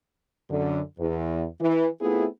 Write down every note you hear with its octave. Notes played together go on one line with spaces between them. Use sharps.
F#2 D3
E2
E3
A3 B3 C4 E4 F4 G#4